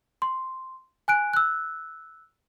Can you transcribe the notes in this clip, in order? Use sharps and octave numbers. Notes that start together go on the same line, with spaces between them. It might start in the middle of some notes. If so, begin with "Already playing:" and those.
C6
G#5 F#6 D7
E6 F#6